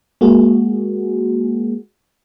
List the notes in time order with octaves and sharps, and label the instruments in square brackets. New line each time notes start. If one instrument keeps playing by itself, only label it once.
[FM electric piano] G#3 A#3 F#4 G#4